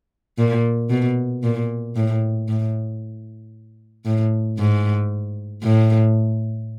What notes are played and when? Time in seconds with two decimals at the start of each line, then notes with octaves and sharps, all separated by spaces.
0.38 A#2
0.90 B2
1.43 A#2
1.96 A2
2.48 A2
4.05 A2
4.59 G#2
5.63 A2